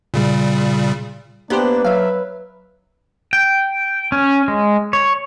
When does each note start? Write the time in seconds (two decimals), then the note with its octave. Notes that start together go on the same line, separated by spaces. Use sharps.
0.14 A#2 C#3 G3
1.50 A#3 B3 D4 G4 B4 C5
1.84 F#3 E5 F5
3.33 G5
4.12 C#4
4.48 G#3
4.93 C#5